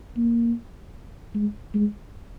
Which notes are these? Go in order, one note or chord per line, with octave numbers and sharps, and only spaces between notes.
A#3
G#3
G#3